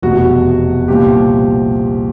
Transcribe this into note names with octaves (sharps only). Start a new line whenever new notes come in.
F1 E2 B2 F#4
C2 A#2 F3 G4